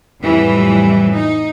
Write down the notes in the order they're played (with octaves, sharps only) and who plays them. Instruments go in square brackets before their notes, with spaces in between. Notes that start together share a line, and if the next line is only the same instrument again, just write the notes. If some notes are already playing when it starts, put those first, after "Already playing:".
[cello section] F2 A2 E3 F#3 G3
D#4